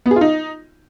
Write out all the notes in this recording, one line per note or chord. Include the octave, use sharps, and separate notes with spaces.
B3
G#4
F4
D#4